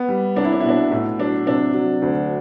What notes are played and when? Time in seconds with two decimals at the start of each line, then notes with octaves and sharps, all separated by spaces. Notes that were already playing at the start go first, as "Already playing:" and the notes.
Already playing: B3
0.09 G3
0.36 C2 D4
0.45 E4
0.52 D4
0.60 E4
0.64 B2 D4
0.91 A2
1.19 F#3 D4
1.47 C3 D4
1.74 F#3
2.02 D2